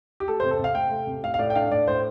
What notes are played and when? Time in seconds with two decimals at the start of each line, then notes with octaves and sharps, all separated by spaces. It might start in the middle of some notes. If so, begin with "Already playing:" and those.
0.20 G4
0.28 A3 A4
0.40 C5
0.43 C3
0.51 A4
0.59 C3 F5
0.75 A3 G5
0.91 A3
1.07 C3
1.23 A2 F5
1.34 F5
1.39 A2 D5
1.50 G5
1.55 D4 F5
1.70 A2 D5
1.88 A2 C5